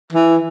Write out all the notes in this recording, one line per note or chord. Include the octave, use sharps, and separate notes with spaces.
E3